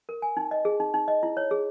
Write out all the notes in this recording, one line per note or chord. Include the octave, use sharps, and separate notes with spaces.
A#4
G#5
D#4
D#5
G#4
D#4
D#4
D#5
E4
C#5
G#4